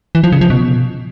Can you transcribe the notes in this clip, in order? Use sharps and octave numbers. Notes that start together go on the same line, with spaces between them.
E3
F3
C#3
F3
B2